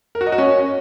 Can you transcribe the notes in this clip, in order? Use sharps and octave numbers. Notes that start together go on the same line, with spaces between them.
A#4
F#4
D#5
F#4
C#4